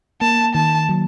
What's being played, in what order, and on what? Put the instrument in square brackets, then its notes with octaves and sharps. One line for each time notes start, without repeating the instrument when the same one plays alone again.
[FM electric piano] A#3 [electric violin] A5
[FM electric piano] D#3 [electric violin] A5
[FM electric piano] F#3